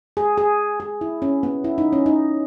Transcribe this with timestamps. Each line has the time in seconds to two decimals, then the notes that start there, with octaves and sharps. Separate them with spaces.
0.17 G#4
0.38 G#4
0.80 G#4
1.01 E4
1.22 C#4
1.43 B3
1.64 E4
1.78 D#4
1.93 C#4
2.06 D#4